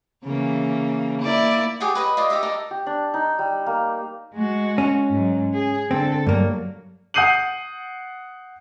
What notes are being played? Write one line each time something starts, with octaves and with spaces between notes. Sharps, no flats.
C#3 E3 A#3
A#3 E4 D5
G4 G#4 C#5 F#5
B4 C#5 D#5
F4 D5 D#5 D6
D#4 G4 D#5 E5
D#4 A4 A#4 D5
G4
D4
D#4
G3
A#3
G#3 F#4
C#4
G#2 F#3
G#4
D3 C4 A4
G2 F#3 A#3
F#5 D#6 G6 C7 D#7 F#7